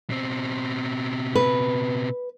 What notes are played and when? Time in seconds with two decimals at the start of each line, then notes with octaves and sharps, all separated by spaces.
0.10 B2 C4
1.35 B4